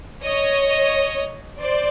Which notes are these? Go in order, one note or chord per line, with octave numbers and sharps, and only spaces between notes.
C#5 D#5
C5 D5